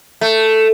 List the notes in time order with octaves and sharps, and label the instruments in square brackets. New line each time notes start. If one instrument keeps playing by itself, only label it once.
[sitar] A3